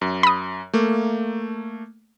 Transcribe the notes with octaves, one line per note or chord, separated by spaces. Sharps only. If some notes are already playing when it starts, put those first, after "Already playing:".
F#2
B5 D#6
A3 A#3